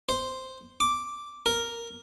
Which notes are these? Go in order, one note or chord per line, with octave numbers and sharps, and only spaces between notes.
C5
D6
A#4